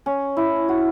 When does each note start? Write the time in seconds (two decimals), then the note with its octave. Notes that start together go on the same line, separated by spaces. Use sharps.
0.06 C#4
0.37 E4
0.69 F#4